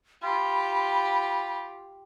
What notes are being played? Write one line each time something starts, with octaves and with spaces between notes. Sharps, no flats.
F4 G4 B5